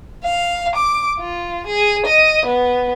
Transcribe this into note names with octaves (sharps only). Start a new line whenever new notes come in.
F5
D6
F4
G#4
D#5
B3